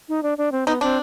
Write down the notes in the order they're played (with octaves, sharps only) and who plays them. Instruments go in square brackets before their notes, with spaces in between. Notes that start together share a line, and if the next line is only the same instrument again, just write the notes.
[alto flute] D#4
D4
D4
C4
[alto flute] B3 [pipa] D#4
[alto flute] C4 [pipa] D4